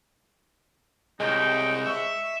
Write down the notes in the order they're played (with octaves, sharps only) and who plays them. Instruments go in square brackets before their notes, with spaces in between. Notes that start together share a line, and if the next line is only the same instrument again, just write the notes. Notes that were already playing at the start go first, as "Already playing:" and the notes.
[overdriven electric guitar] C2 [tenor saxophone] G#3 [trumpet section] D#4 G5
[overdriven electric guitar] E5 [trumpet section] C#6